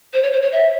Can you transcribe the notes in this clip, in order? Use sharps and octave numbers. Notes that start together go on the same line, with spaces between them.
C5
C#5
C5
C#5
E5